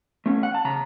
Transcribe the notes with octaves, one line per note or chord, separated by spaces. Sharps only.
A3 C#4
F#5
A5
C#3 A#5